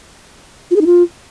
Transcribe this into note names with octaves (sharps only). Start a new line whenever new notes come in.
F4
G#4
D#4
F4